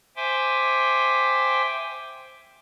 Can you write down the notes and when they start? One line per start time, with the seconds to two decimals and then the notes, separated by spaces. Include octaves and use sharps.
0.16 C5 E5 G5 G#5 C6 D6